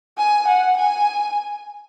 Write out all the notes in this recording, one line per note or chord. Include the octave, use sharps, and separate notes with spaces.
G#5
F#5
G#5